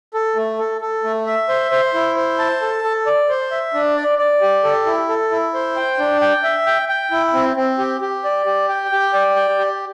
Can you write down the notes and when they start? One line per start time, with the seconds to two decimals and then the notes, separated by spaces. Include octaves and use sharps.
0.14 A4
0.36 A3
0.59 A4
0.81 A4
1.04 A3
1.26 E5
1.49 C5
1.71 C5
1.94 E4
2.16 C5
2.39 A5
2.61 A4
2.84 A4
3.06 D5
3.29 C5
3.51 E5
3.74 D4
3.96 D5
4.19 D5
4.41 G4
4.64 A4
4.86 E4
5.09 A4
5.31 E4
5.54 C5
5.76 G5
5.99 D4
6.21 G5
6.43 E5
6.66 G5
6.89 G5
7.11 E4
7.34 C4
7.56 C4
7.78 G4
8.01 G4
8.24 D5
8.46 G4
8.69 G5
8.92 G4
9.14 D5
9.36 G5
9.59 G4